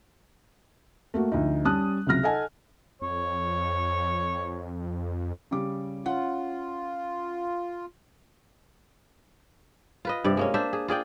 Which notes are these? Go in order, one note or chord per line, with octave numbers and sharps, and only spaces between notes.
A3 A#3 F#4
D2 F3 D#4
G3 C#4 A5 D#6 F#6
C#2 C3 F#3 F6 A#6
A4 D#5 F#5 G#5 A5
F2 C#5
C#3 G3 D6
C#4 F4 F#5
F4 B4 D#5
G2 C3 D5
G#3 A#3 C#4
D4 C5 E5
G#4
F4 G#4 D5 G5